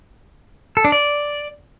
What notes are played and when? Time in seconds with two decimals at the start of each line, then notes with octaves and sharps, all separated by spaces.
0.77 A4
0.85 D4
0.92 D5